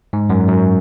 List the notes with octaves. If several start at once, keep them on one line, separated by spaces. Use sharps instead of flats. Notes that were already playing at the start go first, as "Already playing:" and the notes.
G#2
F#2
F#2